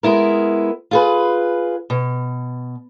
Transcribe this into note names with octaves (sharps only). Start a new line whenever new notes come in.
G#3 B3 E4 A#4
F4 G#4 B4
B2